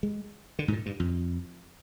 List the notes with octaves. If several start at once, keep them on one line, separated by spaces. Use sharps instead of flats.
G#3
D3
G#2
A#2
G2
F2